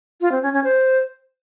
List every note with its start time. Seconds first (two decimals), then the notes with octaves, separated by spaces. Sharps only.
0.21 F4
0.32 C4
0.42 C#4
0.53 C#4
0.64 C5